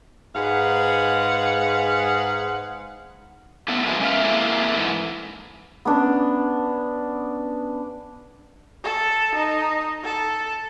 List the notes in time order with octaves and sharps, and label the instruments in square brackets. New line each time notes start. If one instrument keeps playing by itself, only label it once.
[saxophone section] G#2 G#3 G#4 B4 F5 F#5
[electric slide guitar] A2 D3 A3 B3
F2 B2 E3 G#3 G#5
G#3 C#4 A#4 E5 F5
A#3 C4 D4 E4 G#4 A4
G#2 E3
[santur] B3 C#4 D4
[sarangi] A4
D#4
A4